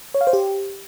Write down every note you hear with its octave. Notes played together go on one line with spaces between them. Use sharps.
C#5
F5
C5
G4